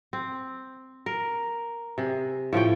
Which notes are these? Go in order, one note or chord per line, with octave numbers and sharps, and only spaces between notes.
C4
A#4
C3 G#4
A2 F3 C#5 G5